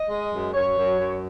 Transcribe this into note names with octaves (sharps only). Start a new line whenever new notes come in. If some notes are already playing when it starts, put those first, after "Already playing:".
Already playing: D#5
G#3
F#2
F#2 C#5
F#2
F#2